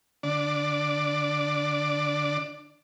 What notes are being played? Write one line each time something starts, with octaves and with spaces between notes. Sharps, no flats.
D3 D4 D5